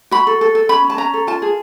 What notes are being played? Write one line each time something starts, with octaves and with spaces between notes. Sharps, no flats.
F#4 B5
A4
A4
A4
C#4 B5
C#4
A5
C#4 A#5
A4
F4 A5
G#4